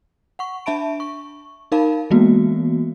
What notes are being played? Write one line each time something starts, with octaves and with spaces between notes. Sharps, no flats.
F#5 C#6
D4 E5 A5 B5 D7
C#6
D#4 A#4 F5 A5 B5
E3 G#3 A#3 B3 F#4